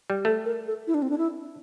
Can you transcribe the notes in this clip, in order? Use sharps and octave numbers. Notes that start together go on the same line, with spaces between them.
G3
A3 A4
A#4
A4
E4
D4
C4
D4
E4